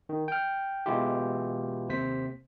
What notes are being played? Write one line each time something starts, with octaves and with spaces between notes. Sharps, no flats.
D#3
G5 F6
B2 E3 G#3 E4 F4 G4
D#2 C3 C5 B6